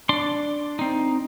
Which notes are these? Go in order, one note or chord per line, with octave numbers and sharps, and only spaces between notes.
D4 D5 C6
C4 D#4